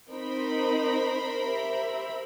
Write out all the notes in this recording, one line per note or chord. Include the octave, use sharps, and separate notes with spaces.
C4 D#4 A#4 C5 B5
G4 E5